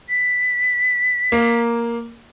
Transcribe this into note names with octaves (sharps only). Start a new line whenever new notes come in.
B6
A#3